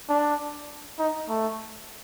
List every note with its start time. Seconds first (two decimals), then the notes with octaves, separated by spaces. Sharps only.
0.09 D4
0.99 D#4
1.29 A3